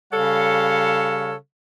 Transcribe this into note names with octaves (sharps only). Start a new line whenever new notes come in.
C#3 G3 A4 C#5 F5